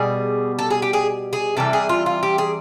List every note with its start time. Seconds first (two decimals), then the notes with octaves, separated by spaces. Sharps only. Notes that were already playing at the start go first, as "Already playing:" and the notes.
Already playing: B2 G3 G#4
0.59 A4
0.71 G#4
0.82 G4
0.93 G#4
1.33 G#4
1.57 C3 E3 G3 A4
1.73 G#4
1.89 F4
2.06 F4
2.23 G4
2.38 G#4